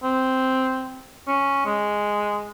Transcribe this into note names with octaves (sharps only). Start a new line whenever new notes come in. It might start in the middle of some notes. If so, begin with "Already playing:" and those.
C4
C#4
G#3